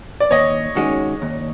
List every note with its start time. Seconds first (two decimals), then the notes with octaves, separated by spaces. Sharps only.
0.20 D5
0.31 D#2 C#5 D#5
0.76 D#3 G#3 C#4 F#4
1.22 D#2